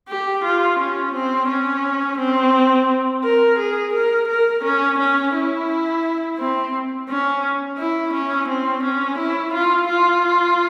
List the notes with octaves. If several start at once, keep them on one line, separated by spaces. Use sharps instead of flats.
G4
F4
C#4
C4
C#4
C4
A#4
G#4
A#4
A#4
C#4
C#4
E4
C4
C#4
E4
C#4
C4
C#4
E4
F4
F4